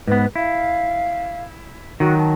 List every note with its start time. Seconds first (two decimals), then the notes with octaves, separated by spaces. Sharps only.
0.08 G#2 B3 B4
0.36 E4 F5
2.00 D#3 F#3 F#4
2.18 A5